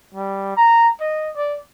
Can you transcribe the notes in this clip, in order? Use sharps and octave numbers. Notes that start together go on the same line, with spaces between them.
G3
A#5
D#5
D5